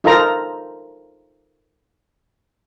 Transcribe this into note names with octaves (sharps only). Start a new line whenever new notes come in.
D#4 F4 A4 A#4 C5 A#5